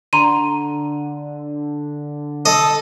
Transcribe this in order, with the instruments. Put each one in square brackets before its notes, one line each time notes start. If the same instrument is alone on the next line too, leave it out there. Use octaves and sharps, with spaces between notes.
[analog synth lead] D3 [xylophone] A#5 C6 D#7
[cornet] A4 [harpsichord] D#5